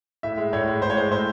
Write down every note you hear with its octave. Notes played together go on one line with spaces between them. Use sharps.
A2 E5
G#3
A2 C#5
G#3
A2 C5
C#5
G#3 C5
A2 C5